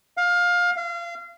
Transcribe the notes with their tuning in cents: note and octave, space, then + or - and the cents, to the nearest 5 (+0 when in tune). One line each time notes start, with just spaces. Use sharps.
F5 +20
F5 -30